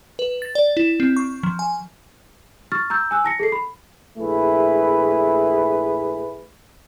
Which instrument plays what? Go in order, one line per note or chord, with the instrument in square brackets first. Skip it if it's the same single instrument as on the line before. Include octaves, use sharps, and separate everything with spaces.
[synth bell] B4
A6
D5
E4
C4
C#6
F3
G#5
[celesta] C#6 F6 A6
A#5 E6 G6
G#5 E6 F#6
A5 A#6 C#7
G#4 A4 C7
B5
[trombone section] A#1 A3 E4 G#4 B4